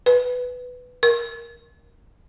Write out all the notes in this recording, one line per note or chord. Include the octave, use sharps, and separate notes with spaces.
B4
A#4